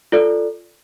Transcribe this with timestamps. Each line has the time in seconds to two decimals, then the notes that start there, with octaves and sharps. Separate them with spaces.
0.12 F4 A4 D5